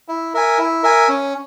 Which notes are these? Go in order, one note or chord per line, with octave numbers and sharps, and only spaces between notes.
E4
A#4 E5 G#5
E4
A#4 E5 G#5
C#4